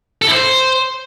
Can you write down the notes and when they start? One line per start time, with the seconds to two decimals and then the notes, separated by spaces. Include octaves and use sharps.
0.22 A4
0.27 E4
0.32 C5